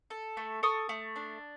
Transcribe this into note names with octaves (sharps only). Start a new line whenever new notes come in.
A4
A3
A4 C#6 D#6
A3
D4